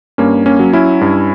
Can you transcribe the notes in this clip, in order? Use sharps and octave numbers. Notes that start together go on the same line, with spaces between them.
G2 A#3 C#4
A#3 C#4
F#3
C#4 E4
G2